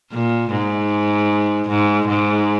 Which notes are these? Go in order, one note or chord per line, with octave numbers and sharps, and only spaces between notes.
A#2
G#2
G#2
G#2